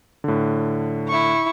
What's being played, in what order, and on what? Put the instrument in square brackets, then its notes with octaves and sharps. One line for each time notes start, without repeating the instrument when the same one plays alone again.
[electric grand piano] A2 D3
[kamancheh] E4 C#6